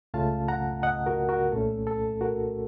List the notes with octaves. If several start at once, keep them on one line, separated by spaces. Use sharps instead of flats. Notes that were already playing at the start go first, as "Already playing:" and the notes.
C#2 C#3 A3 C#4 F4 F5 A5
F#5 A#5
D#5 F#5
F#4 A#4
F#4 A#4
C2 A#2 A3 C#4 A4
A4
F#4 A#4